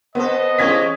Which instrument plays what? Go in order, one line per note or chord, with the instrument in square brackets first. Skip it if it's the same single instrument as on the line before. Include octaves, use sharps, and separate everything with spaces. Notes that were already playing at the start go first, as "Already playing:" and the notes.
[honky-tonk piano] B3 [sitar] C4 A4 [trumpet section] D#5
[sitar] E3 G#3 G4 [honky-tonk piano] C#4 G#6 B6